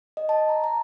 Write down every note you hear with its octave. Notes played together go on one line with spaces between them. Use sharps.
D#5
A5
A#5
A#5